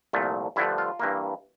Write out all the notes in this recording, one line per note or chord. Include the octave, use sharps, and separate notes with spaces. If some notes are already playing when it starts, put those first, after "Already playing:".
C2 A#2 F3 A3
G2 D3 F3 A3 E4
F4
G2 E3 A#3